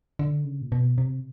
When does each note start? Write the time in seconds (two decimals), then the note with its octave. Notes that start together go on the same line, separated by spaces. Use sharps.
0.19 D3
0.45 C#3
0.62 A#2
0.72 B2
0.98 C3